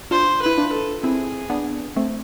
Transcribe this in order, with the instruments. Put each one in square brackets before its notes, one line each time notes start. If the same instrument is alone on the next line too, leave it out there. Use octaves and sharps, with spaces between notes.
[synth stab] D4 F4 [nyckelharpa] C5
[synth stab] E4 [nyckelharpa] B4
[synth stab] D4 F4
[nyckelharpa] A4
[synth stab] C4 E4 [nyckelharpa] G#4
[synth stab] B3 D4
A3 C4